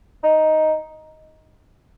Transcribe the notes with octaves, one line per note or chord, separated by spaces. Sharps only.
D#4